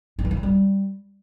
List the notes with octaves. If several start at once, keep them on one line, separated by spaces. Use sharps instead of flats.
D4
E3
D#3
F#3
G3